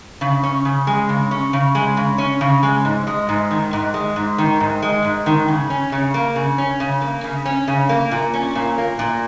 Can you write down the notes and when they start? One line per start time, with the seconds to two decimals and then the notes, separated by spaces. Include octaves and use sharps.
0.21 C#3
0.43 C#4
0.65 C#3
0.87 G#3
1.09 C#3
1.31 C#4
1.53 C#3
1.75 G#3
1.97 C#3
2.18 C#4
2.41 C#3
2.63 G#3
2.85 G#2
3.07 G#3
3.29 G#2
3.51 D#3
3.73 G#2
3.94 G#3
4.16 G#2
4.38 D#3
4.60 G#2
4.82 G#3
5.04 G#2
5.26 D#3
5.48 C#3
5.70 C#4
5.92 C#3
6.14 A#3
6.36 C#3
6.58 C#4
6.80 C#3
7.01 A#3
7.24 C#3
7.45 C#4
7.68 C#3
7.89 A#3
8.11 A#2
8.34 C#4
8.55 A#2
8.78 A#3
8.99 A#2